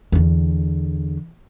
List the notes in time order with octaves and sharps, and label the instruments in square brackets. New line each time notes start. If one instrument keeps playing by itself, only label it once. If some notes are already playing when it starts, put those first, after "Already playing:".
[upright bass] E2 D3